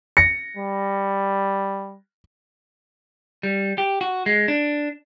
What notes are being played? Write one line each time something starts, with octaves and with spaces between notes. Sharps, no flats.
A#6 C#7
G3
G3
G4
F#4
G#3
D4